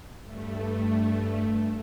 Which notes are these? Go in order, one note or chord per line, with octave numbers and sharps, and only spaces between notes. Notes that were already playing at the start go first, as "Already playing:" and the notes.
G2 A3